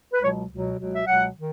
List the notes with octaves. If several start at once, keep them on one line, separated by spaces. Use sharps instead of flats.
B4
C#2 B2 F#3 C#5
C#2 B2 F#3
C#2 B2 F#3
E5
C#2 B2 F#3 F#5
D#3